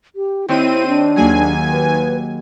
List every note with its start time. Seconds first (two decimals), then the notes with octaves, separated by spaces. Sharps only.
0.16 G4
0.48 D#2 D#3 C4 E4 C#5 D#7
0.88 D4
1.16 D#2 F#3 A#3 G#4 G#5
1.71 B4